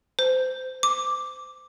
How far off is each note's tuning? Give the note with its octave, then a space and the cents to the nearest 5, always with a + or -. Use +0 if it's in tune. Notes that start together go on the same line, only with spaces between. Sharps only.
C5 -25
D6 -5